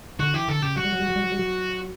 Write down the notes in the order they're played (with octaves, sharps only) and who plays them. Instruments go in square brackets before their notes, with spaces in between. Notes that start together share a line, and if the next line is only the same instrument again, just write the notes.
[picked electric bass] D3 [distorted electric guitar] F#4
[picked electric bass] E3 [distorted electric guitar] G4
[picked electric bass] D3 [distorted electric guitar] A4
[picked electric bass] C#3 [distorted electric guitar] G4
[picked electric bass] F#3 [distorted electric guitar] F#4
[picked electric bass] G3
F#3
G3
F#3
G3
F#3
G3
F#3